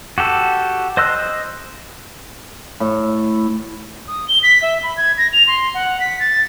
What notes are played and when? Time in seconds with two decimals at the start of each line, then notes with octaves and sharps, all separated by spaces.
0.18 F#4 G4 A4
0.97 C5 D#5 C6 E6 F#6
2.80 A2
4.08 D#6
4.28 G7
4.43 B6
4.62 E5
4.83 B5
4.97 G#6
5.18 A#6
5.33 F7
5.47 C6
5.74 F#5
6.00 B6
6.20 A6